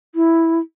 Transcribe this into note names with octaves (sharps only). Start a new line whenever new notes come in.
E4